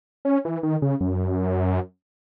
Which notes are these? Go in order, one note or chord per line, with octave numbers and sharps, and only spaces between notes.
C#4
E3
D#3
C#3
F#2